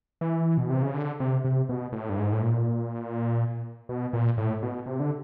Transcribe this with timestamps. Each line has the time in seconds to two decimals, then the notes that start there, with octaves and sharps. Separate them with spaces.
0.21 E3
0.58 B2
0.70 C3
0.82 C#3
0.95 D3
1.20 C3
1.44 C3
1.69 B2
1.93 A2
2.09 G2
2.17 G#2
2.32 A2
2.42 A#2
3.89 B2
4.13 A#2
4.38 A2
4.62 B2
4.86 C3
5.00 D3